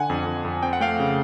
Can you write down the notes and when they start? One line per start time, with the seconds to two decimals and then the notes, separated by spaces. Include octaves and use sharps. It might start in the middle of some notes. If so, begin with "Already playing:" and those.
Already playing: D3 F#5 G#5
0.10 F2
0.26 F2
0.45 F2
0.63 C4 G5
0.73 F#5
0.80 A3 F5 G5
1.00 C#3